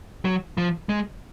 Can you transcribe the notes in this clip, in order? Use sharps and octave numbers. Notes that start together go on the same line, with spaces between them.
F#3
F3
G#3